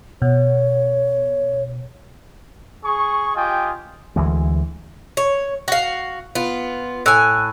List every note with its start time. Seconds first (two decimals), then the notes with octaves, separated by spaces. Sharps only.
0.22 B2 C#5
2.84 G#4 C#6
3.35 F4 G4 D#5 G5 G#5
4.16 D2 E3 G#3
5.17 C#5
5.68 F#4 F5
6.35 B3 F4
7.06 A2 G#5 E6 F#6